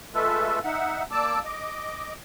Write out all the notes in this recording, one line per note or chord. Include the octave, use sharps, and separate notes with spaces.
G#3 A3 F4 A4 B4 E5
D#4 E5 F#5
A#3 D5 A5 D6 E6
D#5 D6